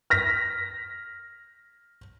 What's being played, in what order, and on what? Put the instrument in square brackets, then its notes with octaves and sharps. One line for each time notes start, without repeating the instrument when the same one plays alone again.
[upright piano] F6 A#6 B6